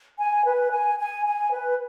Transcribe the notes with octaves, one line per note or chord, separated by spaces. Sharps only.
G#5
B4
G#5
G#5
G#5
B4